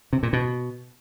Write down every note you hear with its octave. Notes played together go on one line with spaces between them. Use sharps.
C3
A#2
B2